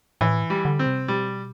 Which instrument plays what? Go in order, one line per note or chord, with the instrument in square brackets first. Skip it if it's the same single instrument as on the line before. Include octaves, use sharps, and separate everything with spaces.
[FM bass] A2 [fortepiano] E3
[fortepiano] G3
[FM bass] D3
[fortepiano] C4
[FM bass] C3
[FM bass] B2 [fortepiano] G3